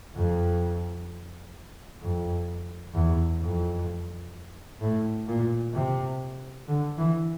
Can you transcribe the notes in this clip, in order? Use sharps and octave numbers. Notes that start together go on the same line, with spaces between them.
F2
F2
E2
F2
A2
A#2
C3
D3
E3